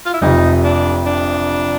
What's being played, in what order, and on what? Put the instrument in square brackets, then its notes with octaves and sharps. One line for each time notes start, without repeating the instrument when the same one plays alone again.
[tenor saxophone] F4
E4
[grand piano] F1 F2 C3 [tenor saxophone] D#4
[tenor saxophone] D4
D4